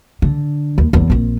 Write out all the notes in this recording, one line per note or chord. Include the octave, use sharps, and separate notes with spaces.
D3
D#2
A1 E2
A#1 C4